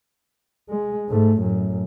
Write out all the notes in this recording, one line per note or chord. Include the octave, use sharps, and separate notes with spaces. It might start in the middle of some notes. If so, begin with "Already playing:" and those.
G#3
G#2 A3
F#2 A2